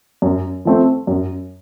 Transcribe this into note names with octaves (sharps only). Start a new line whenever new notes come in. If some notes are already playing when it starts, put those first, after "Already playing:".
F#2
F3 A3 C4
F#2